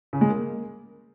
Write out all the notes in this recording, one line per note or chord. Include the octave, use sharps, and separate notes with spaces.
C#3
G#3
A#3